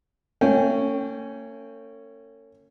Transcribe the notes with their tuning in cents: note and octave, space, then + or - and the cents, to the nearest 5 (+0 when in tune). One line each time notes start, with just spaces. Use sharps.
A#3 -45 C#4 +0 G5 +0